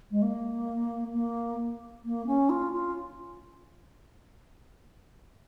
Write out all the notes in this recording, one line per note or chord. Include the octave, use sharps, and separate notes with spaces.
G#3
A#3
A#3
A#3
C#4
F4
F4